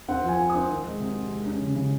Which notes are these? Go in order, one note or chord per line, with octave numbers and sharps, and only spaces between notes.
C4 F#5
F3
G#5
F3
D#6
C4
D#3
G#3
C3
C3
G#3
C#4
C#3
C#3